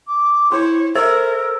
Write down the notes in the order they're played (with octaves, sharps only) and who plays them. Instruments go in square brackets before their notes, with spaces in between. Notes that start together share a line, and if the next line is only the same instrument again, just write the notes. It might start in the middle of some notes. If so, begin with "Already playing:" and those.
[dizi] D6
[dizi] E4 [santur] C5 [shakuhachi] C#5
[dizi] A4 [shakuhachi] A#4 [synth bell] C5 [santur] E5